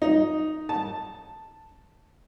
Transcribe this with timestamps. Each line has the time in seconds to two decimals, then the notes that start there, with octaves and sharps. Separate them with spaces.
0.02 D#4
0.69 A5